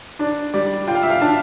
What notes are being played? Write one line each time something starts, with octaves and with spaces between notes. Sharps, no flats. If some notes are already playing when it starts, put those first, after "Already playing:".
D4 D5
G3 D5
F4 G5
F5
E5
F5
D4 A5